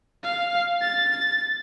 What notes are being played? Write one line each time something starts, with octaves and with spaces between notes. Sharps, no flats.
F5
A6